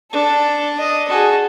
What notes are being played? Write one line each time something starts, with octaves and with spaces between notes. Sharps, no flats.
D4 A4
D#5
F#4 G#4 A4